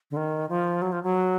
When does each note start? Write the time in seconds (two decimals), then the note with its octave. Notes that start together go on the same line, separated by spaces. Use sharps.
0.11 D3
0.17 D#3
0.49 F3
0.82 F#3
0.92 F3
1.03 F#3